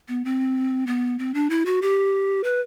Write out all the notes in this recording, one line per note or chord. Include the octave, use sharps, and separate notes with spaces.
B3
C4
B3
C4
D4
E4
F#4
G4
B4